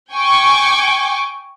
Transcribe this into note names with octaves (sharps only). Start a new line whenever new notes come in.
G5 G#5 C#6 D6